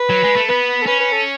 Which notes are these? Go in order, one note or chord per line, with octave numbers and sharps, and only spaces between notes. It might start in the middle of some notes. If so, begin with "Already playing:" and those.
Already playing: B4
F#3
G#3
A3
B3 B4
A4
C#4 B4
B4
A4